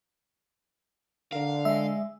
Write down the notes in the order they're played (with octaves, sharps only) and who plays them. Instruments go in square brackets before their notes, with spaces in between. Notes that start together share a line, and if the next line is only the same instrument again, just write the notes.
[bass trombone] D3 [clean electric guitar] A#4 [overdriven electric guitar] F5
[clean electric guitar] G#3 G#5 [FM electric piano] E5